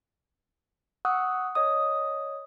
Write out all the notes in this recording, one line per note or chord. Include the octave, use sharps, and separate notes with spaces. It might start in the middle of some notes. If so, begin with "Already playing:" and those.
F#5 C#6 D#6 E6 F#6
C#5 D#5 D#6